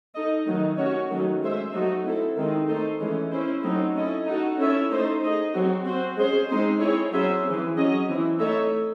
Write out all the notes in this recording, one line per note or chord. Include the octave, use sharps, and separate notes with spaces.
D#4 A4 D#5
D#3 F#3 A3 D#4
C#4 F#4 C#5
D#3 F#3 A3 C#4
G#3 C#4 G#4 C5 E5
F#3 A3 D#4 F#4
C4 E4 A4
D#3 G#3 C4 D#4
A3 D#4 A4 C5
E3 G#3 C#4
C#4 E4 C5
F#3 A3 C4 D#4
C#4 E4 A4 D#5
D#4 F#4 A4
C#4 E4 A4 C#5 E5
A3 D#4 A4 C5
D#4 G#4 D#5
F#3 C4 F#4
C4 F#4 C5
G#3 C#4 G#4 C5
G#3 C4 D#4 G#4 C5
C4 E4 G#4 C#5
F#3 C#4 G#4 C5 E5
E3 G#3 C4
F#3 C#4 G#4 D#5
E3 C4 E4
A3 D#4 A4 C#5 E5